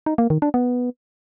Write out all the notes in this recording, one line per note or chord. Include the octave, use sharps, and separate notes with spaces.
D#4
A#3
D#3
D4
B3